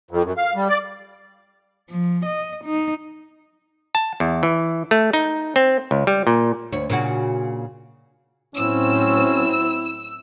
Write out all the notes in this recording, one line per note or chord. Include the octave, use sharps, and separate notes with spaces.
F2
F#2
F5
G3
D5
F3
D#5
D#4
A5
E2
E3
A3
D#4
C4
C#2
G3
A#2
D2 C#5
A#2 C#3 F#4
A2 F#3 C4 C#4 E4 E6